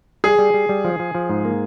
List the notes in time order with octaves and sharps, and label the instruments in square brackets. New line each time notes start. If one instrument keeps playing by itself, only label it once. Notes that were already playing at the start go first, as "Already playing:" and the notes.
[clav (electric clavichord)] G3 [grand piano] G#4
[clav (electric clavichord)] G3
G3
G3
F3
F3
F3
G#2
A#3